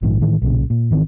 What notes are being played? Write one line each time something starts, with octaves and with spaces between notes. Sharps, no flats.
A#1 G#2 D#3 F3
A2 D#3 E3
B1 A#2 C#3
A#2
G#1 D#3 E3 C4